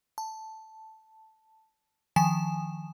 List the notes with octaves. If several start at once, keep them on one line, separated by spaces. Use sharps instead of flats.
A5
D#3 F3 G#5 E7